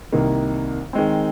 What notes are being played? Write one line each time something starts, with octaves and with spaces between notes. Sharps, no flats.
C2 C3 D#3 A#3
D#3 G#3 C4